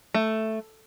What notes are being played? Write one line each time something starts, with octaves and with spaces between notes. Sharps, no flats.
A3